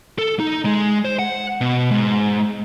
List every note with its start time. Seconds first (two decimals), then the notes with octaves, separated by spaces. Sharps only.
0.18 A4
0.40 D#4
0.65 G#3
1.05 C5
1.19 F#5
1.61 B2
1.91 G#2